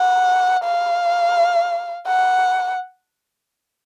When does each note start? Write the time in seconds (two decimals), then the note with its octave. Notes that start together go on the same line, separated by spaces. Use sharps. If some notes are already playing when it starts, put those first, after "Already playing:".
Already playing: F#5
0.64 F5
2.08 F#5